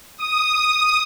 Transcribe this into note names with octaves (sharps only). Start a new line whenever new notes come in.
D#6